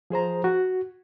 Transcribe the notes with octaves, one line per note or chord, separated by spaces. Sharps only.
F3 G#4 C5 A#5
F#4